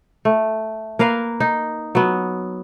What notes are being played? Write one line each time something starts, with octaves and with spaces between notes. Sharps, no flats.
A3
A#3 A#4 B4 F5
D#4
F#3 B3